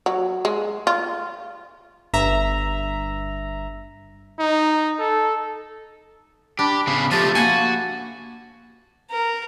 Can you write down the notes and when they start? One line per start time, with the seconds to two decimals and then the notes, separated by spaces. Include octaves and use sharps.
0.06 F#3
0.45 G#3
0.87 F4
2.13 G1 G2 E5 A#5
4.39 D#4
4.99 A4
6.59 D4 G4 B5
6.87 C#3 B3
7.11 F3 A3 G4 A5
7.35 A#3 F#4 G#5
9.10 A#4